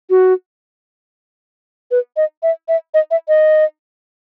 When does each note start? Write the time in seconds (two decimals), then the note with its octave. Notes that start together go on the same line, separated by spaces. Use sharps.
0.10 F#4
1.91 B4
2.17 D#5
2.43 E5
2.68 E5
2.94 D#5
3.11 E5
3.28 D#5